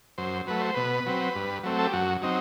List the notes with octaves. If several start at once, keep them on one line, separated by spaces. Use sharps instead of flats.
F#2 C5
F#3 A3 B4
C5
B2 B4
F#3 C4
G2
F#3 A3 C4
A4
G4
F#2 F#4
F#3 C4 D#4